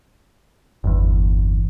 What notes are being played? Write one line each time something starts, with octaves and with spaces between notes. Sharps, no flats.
G1 E2